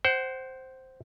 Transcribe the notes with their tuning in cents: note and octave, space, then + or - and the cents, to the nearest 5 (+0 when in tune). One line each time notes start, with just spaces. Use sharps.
C5 +0 F#5 +35